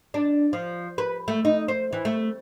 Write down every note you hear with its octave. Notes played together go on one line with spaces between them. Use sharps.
D4
F3
B4
A3
D#4
C5
E3
A3